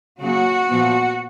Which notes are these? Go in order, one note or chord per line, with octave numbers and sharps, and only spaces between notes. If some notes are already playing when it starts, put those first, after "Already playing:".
C#3 F#3 A#3 F#4
A#2 F3 B3